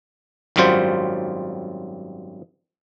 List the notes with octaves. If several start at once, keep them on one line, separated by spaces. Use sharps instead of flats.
G#1 F#2 F#3 G3 F4 C5